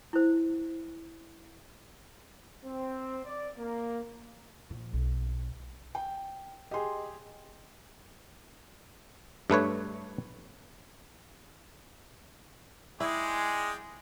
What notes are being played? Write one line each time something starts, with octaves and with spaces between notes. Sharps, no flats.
E4 C5
C4
D5
A#3
A#2 F3
B1
G5
G4 G#4 D#5 C6
G2 A3 B4 C#5
G#3 E4 G#4 D5 G5